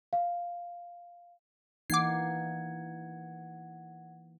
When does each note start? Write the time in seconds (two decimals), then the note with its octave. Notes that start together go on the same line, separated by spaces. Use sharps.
0.13 F5
1.90 E3 A#3 D#4 F#5 D6 G#6 C7